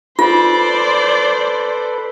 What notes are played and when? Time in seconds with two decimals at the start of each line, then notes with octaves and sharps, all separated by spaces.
0.19 F4 A4 B4 C5 D5 B5